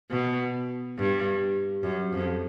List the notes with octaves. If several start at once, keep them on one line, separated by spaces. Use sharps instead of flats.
B2
G2
F#2
F2